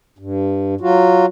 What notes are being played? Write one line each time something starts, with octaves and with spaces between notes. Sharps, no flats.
G2
F#3 F4 F#4